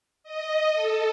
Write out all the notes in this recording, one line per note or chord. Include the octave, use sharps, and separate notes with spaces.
D#5
A4